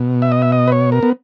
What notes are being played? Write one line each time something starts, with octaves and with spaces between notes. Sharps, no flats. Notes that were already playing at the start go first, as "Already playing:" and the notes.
Already playing: B2
E5
D#5
E5
D#5
B4
C#5
A#4
B3